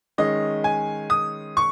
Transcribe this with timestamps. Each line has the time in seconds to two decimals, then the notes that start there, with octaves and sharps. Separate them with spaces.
0.18 D#3 G#3 C#4 D#5
0.64 G#5
1.10 D#6
1.57 C#6